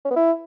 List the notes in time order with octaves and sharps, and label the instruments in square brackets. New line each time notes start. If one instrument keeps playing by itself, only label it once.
[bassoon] C#4
B3
E4